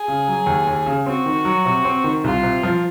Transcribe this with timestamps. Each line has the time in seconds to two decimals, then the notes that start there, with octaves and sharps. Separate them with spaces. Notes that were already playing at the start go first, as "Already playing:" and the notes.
Already playing: G#4
0.08 C#3
0.28 F#3
0.46 D#2
0.67 D#2
0.86 C#3
1.06 C4 F#4
1.26 D#3
1.45 F#3
1.65 C3
1.85 C4
2.04 D#3
2.23 C2 F4
2.43 C3
2.63 F3